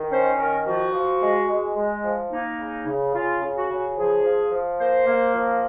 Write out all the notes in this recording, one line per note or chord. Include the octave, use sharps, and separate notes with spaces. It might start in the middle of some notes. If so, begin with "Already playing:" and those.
Already playing: D#3
C#4 C5
D#3 A#4
F3 F#4
F3
G#3
G#3
G#3
F3
A#3 D#4
C#3
C#3
C#3 F4
C#3
F#4
C#3
F3 G#4
F3
F3
A#3 C5
A#3
F3